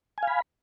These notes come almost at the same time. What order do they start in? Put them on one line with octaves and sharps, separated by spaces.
G#5 F5 B5